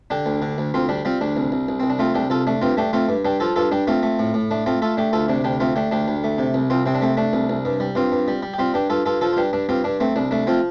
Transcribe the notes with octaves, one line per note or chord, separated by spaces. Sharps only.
D3 D4 G4
D2
D3
D2
D2 C4 F4
G3 D4
G3 C4 F4
D2 D4
C2
C2
C2
C2 C4
D4
A3 C4 F4
C2 D4 G4
C2 F4 A4
A3 D4
G2 C4 F4
A3 D4 G4
A3 C4 F4
G2
G2 D4 G4
F3 F4 A4
G2 F4 A4
G2 D4 G4
A3 C4 F4
A3
A2
A2
A3 D4
A3 C4 F4
A3 F4 A4
A3 D4 G4
D2 F4 A4
C3 D4
D2 D4 G4
A3 C4 F4
A3 D4 G4
D2 D4 G4
D2
A3
C3
C2
C2 C4 F4
C3 C4
D4
A3 C4
A3 D4
C2
C2
G2
G3
G2 C4 F4
G2
G3
G3
G4
G3 C4 F4
G2 D4 G4
G2 F4 A4
G2 F4 A4
F3 F4 A4
F4
G2 D4 G4
G2 D4
G2 C4 F4
G2 D4
A3 C4
C2 D4
A3 D4
F3 C4 F4